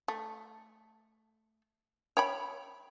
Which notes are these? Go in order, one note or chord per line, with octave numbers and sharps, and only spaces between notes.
A3
C#5 G5 B5